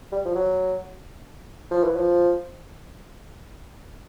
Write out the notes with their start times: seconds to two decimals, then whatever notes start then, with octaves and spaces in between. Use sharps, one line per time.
0.12 G3
0.25 F3
0.35 F#3
1.71 F3
1.84 E3
1.96 F3